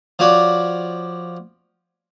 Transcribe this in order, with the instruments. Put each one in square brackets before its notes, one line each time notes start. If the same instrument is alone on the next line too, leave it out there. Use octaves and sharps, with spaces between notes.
[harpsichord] F3 F#4 C#5 D5